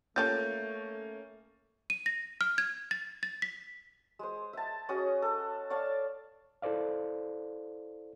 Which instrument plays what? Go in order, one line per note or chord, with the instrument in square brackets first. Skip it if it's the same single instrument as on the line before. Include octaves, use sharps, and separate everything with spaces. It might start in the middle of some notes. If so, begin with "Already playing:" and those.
[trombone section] A3 [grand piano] A#3 C#4 A6 [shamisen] F4 G4 A4 [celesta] G6
[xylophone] D#7
A#6
F6
G#6
A6
A6
B6
[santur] G#3 C5
E5 A5
C#4 F#4 G#4 D#5
A4
C#5 D5 F5 A5
[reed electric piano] E4 A4 C5 D5 F5